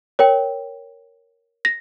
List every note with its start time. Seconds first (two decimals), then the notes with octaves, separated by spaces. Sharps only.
0.19 A#4 C#5 G5
1.65 A#6